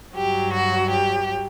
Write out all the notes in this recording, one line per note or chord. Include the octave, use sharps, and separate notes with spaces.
G2 F#3 G4
F#4
G4